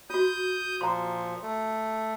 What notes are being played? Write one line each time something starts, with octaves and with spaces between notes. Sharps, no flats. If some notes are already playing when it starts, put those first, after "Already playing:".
F4 F#4 D#6 G6
A#2 F3 A#5 C6
A3